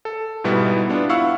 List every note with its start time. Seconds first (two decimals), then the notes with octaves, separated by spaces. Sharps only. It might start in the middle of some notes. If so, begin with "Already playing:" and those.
0.05 A4
0.44 G#2 B2 G3 B3 E4
0.90 B3 D4 F4
1.09 E4 F5 F#5 C#6 E6